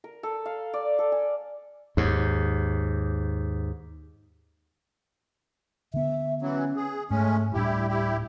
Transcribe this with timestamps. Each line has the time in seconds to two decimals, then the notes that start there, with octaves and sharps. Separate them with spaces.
0.04 A#4
0.23 A4
0.45 F5
0.74 D5
0.99 A4
1.12 G#5
1.97 D#2 G#2
5.94 D3 B3 E5
6.41 E3 F#3 C#4
6.76 G#4
7.10 G#2 G#3 A3 C#4
7.54 D1 A2 G3 D4 E4 G4
7.88 E4 G4